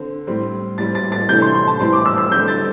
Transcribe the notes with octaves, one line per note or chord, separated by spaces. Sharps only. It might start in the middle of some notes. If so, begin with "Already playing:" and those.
Already playing: D3 C4
A2 G3 C4
A2 G3 C4 A6
A6
A6
C3 E3 A3 D4 G6
C6
C6
A5
A2 E3 G3 C4 C6
D6
E6
E6
D3 G3 C4 G6
A6